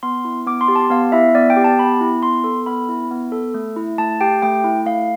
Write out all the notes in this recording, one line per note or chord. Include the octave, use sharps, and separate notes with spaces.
B3 C6
E4
B3 D6
C6
G4
A5
B3 F5
E4 E5
B3 D5
G5
G4
A5
B3 B5
E4
B3 C6
A4
B3 B5
E4
B3
A4
A3
E4
A3 A5
G4 G5
A3 G5
E4
A3 F5